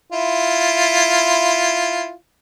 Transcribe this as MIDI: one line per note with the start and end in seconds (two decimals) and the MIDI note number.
0.12 2.12 64
0.12 2.12 65